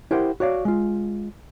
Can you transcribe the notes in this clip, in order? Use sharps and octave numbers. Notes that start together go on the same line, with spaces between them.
E4 G4 A#4 C5 F#5 G5
F#4 C#5 D5 F5
G#3 F4